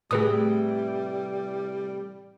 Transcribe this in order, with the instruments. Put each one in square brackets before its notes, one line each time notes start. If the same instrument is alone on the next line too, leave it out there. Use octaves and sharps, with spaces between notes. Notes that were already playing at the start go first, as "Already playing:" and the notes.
[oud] A2 C3 E3 [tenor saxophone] G3 [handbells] G#4 B4 D#6